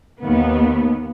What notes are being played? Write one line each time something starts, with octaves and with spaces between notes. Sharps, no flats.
D#2 B3